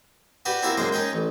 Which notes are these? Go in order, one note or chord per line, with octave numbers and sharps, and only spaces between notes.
F#4 G4 B4 D5
C4 E4 F#4 G4 A#4 F5
F#2 G#3 A#3 C5 F5
C#4 D#4 C#5 G5
A1